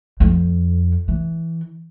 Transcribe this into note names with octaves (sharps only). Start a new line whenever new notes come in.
F2
E3